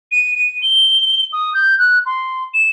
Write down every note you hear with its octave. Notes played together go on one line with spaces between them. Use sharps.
D#7
D#7
G7
D#6
G6
F#6
C6
E7